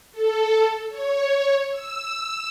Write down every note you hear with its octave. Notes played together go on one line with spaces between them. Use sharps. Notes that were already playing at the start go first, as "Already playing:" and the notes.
A4
C#5
E6